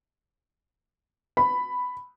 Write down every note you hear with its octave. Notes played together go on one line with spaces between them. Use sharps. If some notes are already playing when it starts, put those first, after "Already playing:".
B5